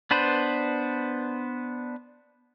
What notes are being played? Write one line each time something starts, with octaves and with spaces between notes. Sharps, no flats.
B3 D4 B4 C5